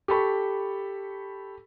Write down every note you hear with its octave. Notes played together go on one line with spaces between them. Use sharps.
G4 A4 B5 C#6